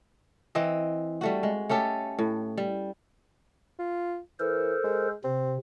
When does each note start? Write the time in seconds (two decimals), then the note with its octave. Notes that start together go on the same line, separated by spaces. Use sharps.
0.55 E3 C4 D#5
1.21 G3 A3 F#4
1.43 G#3
1.69 A3 C#4 G4 A4
2.19 A2
2.57 G3
3.79 F4
4.40 E3 A4 A#4 C5
4.84 G#3
5.24 C3 C4